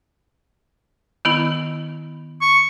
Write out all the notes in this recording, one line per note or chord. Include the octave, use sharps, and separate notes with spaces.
D#3 B3 E4
C#6